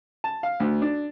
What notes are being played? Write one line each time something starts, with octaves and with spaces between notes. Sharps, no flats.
A5
F5
D2
D4